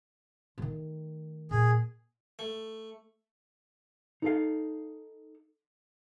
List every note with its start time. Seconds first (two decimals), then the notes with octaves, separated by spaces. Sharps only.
0.58 D#3 A3
1.51 A#2 G#4
2.39 A3
4.22 D#4 A4 F5